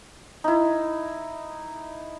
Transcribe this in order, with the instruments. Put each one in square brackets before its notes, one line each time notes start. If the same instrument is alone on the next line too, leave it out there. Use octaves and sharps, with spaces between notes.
[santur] D#4 E4